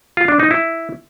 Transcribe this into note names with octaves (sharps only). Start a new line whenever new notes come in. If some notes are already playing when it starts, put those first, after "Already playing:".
F4
D4
D#4
E4